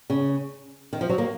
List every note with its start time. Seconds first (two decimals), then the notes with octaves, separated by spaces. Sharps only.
0.10 C#3
0.93 D#3
1.01 F3
1.09 F#3
1.18 A#3